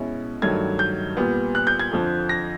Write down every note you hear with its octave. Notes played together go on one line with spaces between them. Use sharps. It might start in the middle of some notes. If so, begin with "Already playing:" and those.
Already playing: B2 G#3 C#4 E4
G2 D#3 F#3 A3 G#6
G6
A#2 G3 B3
F#6
G6
G#6
F2 D3 F3
A#6